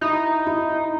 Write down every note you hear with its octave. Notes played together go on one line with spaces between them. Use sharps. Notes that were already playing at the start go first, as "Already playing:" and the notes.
D#4 E4
E4